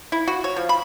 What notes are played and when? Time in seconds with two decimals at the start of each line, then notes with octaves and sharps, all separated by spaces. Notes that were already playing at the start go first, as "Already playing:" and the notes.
0.12 E4
0.28 F#4
0.44 C#5
0.56 F3
0.69 B5